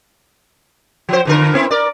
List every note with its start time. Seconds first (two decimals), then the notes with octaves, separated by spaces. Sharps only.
1.09 F3 C5
1.25 F2 D3 A#4
1.55 B3 C4 E4
1.71 A#4 D5